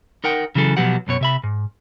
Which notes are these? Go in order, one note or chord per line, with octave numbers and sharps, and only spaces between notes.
D#4 A#4 F#5 G5
C#3 E3 F#3 G#4 A4
B2 F3 F#3 B3 G4 F#5
B1 F#2 B2 C#5
C3 E5 B5
G#2